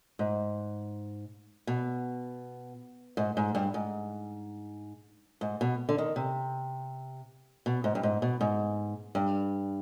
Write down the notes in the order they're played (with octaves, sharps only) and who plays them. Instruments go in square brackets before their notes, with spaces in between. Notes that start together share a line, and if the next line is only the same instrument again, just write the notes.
[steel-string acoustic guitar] G#2
B2
G#2
G#2
G2
G#2
G#2
B2
D3
D#3
C3
B2
G#2
G2
G#2
B2
G#2
G2